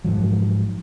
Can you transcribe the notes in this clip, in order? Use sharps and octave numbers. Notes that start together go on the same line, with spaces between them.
G#2 F3 F#3